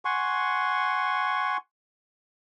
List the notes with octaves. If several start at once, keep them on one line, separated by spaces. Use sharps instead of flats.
F#5 G#5 C6 C#6